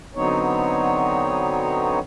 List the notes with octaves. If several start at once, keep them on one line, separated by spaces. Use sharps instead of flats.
D3 F#3 B3 C4 D#4 C#5